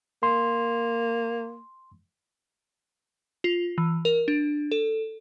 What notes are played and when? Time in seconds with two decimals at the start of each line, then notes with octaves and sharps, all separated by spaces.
0.23 A#3 C6
3.44 F4
3.78 E3
4.05 A#4
4.28 D4
4.72 A4